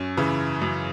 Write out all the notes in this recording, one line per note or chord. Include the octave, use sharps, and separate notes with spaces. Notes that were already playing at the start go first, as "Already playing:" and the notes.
Already playing: F#2 C#4
C#3 E3
F#2